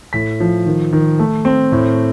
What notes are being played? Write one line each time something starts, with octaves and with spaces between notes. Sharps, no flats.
A2 B6
F3
D#3
D#3
A3
C4
A2